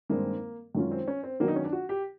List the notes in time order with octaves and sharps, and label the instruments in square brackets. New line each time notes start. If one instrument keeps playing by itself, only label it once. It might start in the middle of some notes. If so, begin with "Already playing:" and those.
[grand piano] G2 D#3 G#3 C4 [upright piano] A#3
[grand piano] F#2 D#3 G#3 C#4 F4
[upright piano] C4
C#4
C4
[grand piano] D#3 F#3 B3 D4 [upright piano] A#3
[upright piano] D#4
C#4
D4
F#4
G4